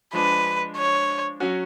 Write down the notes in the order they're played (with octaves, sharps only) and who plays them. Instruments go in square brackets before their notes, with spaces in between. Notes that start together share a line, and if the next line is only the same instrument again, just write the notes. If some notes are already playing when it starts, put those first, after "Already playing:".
[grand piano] F3 G#3 D4 [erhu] B4
[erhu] C#5
[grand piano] F#3 C#4 F#4